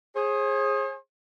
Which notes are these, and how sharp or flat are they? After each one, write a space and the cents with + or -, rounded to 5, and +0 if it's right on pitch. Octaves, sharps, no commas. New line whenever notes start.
G#4 +0 C5 +45